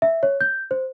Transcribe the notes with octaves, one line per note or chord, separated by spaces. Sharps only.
E5
C#5
G6
C5